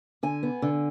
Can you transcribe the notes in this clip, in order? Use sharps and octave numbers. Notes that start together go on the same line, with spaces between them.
D3 G#5
B3
D3